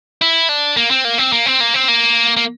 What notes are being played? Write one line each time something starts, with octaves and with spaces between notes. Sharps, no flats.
E4
D4
A#3
C4
A#3
C4
A#3
C4
A#3
C4
A#3
A#3